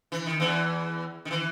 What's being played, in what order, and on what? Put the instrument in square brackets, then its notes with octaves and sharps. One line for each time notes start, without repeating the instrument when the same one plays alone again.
[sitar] E3
D#3
E2 E3
D#3
E3